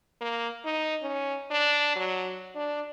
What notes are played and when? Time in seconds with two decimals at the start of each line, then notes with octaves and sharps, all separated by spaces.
0.21 A#3
0.65 D#4
1.03 C#4
1.51 D4
1.96 F#3
2.56 D4